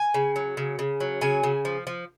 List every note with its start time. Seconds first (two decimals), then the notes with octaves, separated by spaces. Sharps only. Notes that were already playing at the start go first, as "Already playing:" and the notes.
Already playing: G#5
0.14 C#3
0.36 F#3
0.57 C#3
0.79 C#3
1.00 F#3
1.21 C#3 G#5
1.43 C#3
1.65 F3
1.87 F3